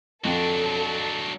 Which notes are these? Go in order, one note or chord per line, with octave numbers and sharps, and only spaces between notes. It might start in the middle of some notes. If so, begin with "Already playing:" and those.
F2 F#3 D4 A4 G5